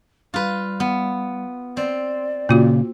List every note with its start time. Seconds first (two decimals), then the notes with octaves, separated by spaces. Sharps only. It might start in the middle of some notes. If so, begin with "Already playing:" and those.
0.34 G3 F4 B4
0.80 B3
1.77 C4 D5
2.49 A#2 C#3 A#3 F4 F#4